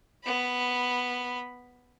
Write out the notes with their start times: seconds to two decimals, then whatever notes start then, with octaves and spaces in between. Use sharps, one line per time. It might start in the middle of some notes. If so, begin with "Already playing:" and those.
0.23 B3 B5